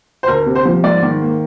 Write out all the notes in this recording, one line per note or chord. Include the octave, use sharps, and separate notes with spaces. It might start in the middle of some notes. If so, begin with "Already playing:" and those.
C5
D2 A#4
C3
C5
F3
G#2 D5
D#3
A#3